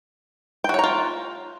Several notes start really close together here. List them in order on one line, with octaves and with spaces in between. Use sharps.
G5 F#4 C#5 A#5 F4